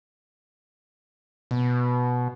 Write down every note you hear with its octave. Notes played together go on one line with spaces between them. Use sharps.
B2